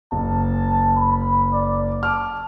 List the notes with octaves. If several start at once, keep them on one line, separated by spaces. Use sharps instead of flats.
F#1 A5
B5
D5
A5 D6 F6